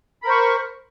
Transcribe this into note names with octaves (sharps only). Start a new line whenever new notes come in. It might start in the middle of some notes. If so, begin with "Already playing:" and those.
A#4 C5 B5 C#6